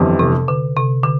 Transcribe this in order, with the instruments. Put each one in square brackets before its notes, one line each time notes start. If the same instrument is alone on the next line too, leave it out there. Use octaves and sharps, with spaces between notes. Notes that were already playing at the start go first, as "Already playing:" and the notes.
Already playing: [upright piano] G1 F2 E3 G3
[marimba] C3
D3
C3
D3